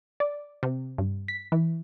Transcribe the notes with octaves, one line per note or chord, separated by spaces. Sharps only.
D5
C3
G2
B6
E3